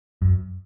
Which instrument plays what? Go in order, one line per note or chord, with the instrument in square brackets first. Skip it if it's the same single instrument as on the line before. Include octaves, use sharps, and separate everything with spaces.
[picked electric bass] F#2